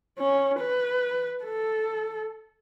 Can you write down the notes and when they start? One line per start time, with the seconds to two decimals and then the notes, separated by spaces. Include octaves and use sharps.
0.18 C#4
0.60 B4
1.44 A4